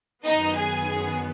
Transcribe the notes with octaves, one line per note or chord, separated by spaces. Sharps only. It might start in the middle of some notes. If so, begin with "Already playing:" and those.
F#2 D#3 B3 D#4 D#5
G#4 G#5
G#4